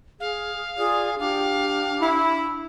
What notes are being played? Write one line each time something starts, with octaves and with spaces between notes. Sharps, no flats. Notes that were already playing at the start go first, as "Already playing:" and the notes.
G#4 F5
F4 G#4 D5 D#6
D4 G4 F5 G5
E4